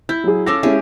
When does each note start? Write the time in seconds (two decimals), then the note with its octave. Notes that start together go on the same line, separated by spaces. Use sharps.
0.09 E4 G6
0.24 F#3 G#4
0.46 C#4 A4 F5 D6 E6 A#6
0.63 G#3 C#4 E4 G4 G#4